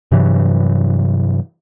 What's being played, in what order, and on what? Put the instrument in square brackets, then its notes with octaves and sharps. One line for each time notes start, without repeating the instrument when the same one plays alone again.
[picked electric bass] G2 C3 E3 F#3